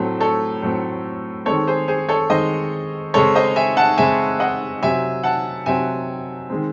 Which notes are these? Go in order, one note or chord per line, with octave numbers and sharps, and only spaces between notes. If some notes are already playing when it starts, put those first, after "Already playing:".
Already playing: A2 F#3 A3 C4 A4
A4 C#5
A2 F#3 A3 C4
D#3 G#3 C4 A4 C#5
G#4 C5
G#4 C5
A4 C#5
D#3 G#3 C4 C5 D#5
C#3 G#3 C4 A4 C#5
C5 D#5
E5 G#5
F#5 A5
C#3 G#3 C4 E5 G#5
D#5 F#5
C3 F#3 C4 E5 G#5
F#5 A5
C3 F#3 C4 E5 G#5
D#3 G#3 C4